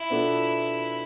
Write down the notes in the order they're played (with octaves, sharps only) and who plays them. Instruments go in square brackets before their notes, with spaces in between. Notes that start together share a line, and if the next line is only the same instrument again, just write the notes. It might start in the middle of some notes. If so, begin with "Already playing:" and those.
Already playing: [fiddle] E4
[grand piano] B2 B3 D4 F4 A4